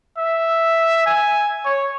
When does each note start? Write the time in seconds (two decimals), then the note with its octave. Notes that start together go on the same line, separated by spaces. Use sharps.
0.18 E5
1.06 G#5
1.66 C#5